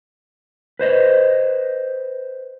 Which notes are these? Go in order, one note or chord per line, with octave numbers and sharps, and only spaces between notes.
B4 C5 D#5